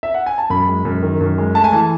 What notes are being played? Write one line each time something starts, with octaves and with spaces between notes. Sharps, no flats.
E5
F#5
G#5
A5
F#2 B5
G#3
F#2
D#3
F#2
G#3
A3 A5
G#5
E3 A5